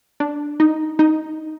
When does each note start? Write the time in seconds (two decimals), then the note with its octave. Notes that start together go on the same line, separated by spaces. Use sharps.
0.20 D4
0.60 D#4
0.99 D#4